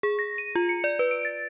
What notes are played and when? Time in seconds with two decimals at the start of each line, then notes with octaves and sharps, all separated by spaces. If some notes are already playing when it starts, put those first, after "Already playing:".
0.03 G#4
0.19 A#6
0.38 D#7
0.55 F4
0.69 C#7
0.84 D5
0.99 B4
1.11 D7
1.25 A6